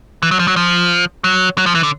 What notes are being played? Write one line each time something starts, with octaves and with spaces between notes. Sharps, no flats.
E3
F#3
F3
F#3
F3
F#3
F#3
F3
E3
D3